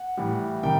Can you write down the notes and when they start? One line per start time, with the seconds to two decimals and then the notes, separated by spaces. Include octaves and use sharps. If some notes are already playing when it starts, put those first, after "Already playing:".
Already playing: F#5
0.17 A2 E3 G3
0.63 C3 D#3 G3 G5